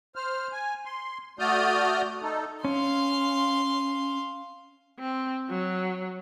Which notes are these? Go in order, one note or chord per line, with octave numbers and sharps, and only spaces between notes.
C5 F6
G#5
C6
A3 F#4 D5 D#6 F6 G6
D#4 A4
C#4 F5 C6
C4
F#3